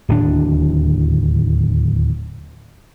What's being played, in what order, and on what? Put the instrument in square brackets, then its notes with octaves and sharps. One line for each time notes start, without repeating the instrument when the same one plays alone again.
[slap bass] D1 D#2 A2 D4